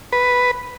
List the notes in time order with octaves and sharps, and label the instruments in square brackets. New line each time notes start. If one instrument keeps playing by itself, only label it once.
[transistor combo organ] B4